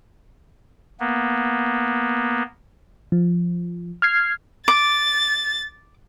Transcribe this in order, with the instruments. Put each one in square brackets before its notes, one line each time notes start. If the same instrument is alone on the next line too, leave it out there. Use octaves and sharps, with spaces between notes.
[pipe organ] A#3 B3
[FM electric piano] F3
F6 G#6 C7
[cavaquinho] D6 [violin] A6